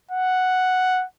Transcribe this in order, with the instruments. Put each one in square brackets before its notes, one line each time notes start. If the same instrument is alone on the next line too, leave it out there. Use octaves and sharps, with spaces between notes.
[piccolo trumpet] F#5